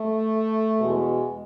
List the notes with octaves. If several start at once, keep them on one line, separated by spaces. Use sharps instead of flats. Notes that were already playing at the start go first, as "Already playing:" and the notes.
Already playing: A3
E2 B2 G#3